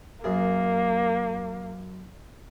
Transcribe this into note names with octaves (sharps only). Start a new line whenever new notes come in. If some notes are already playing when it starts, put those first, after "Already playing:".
F#2 A#3 G#4